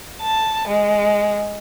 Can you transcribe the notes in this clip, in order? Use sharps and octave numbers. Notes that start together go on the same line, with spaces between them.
A5
G#3